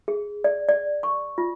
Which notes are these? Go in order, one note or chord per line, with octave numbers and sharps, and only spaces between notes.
G#4
D5
D5
C#6
F4